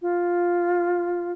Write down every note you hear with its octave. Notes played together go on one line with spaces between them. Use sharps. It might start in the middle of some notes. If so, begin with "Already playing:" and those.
F4